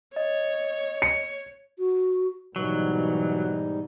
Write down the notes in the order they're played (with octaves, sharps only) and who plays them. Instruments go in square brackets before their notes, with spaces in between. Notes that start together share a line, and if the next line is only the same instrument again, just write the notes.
[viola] C#5 [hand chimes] D#5
[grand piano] C#7
[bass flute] F#4
[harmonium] G#2 G3 D#4 [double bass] B2 E3 [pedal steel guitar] F#3